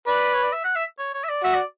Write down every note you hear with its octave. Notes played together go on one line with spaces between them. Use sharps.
B4 D5
C#5
D5
E5
F#5
E5
C#5
C#5
E5
D5
F#4 E5
D5